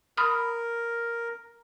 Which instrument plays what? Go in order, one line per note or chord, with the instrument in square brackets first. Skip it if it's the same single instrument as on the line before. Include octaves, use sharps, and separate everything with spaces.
[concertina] A#4 [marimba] B5 D#6 F6